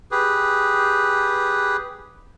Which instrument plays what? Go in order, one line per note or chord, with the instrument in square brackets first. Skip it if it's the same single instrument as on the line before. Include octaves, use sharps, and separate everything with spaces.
[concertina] G4 G#4 B4